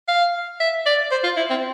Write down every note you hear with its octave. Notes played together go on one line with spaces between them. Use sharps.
F5
E5
D5
C5
F4
E4
C4